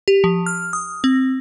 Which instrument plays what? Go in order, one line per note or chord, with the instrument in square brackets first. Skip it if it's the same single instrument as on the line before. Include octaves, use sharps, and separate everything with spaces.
[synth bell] G4
F3
F6
D#6
C4